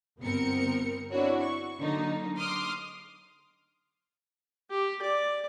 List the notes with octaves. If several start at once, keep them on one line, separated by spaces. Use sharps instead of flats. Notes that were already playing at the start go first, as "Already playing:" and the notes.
G1 B3 C4 A#4 C#7
C4 D4 E4 F#4 C#5
C#6
D3 F#3 A#3 D#4
C6 D6 D#6 F6
G4
D5